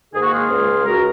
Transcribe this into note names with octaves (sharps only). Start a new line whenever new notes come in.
G#2 D#3 A#3 G#4
F#4
F4 G#4
C#2 C#3 G#3
C#2 C#3 G#3 F#4 A#4